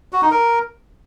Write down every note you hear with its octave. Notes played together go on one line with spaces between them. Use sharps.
F#4
D#4
A#4